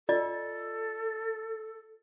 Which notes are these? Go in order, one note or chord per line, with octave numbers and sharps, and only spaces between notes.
F4 A4 D5 D#5